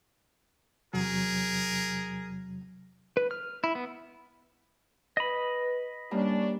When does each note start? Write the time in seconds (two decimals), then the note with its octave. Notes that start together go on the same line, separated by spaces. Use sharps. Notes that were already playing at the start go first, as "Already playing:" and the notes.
0.94 E2 C3 F#3 G#4 A#4
3.17 B4
3.31 F6
3.64 E4
3.75 B3
5.17 B4 D#5 B5
6.11 G3 A#3 C#4 D4